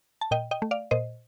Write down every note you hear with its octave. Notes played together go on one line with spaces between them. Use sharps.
A5
A#2 D#5 G5
D#5 G5
A3
D5 F5
A#2 C5 D#5